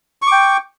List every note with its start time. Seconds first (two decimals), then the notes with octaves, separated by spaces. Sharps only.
0.22 C#6
0.27 D6
0.32 G5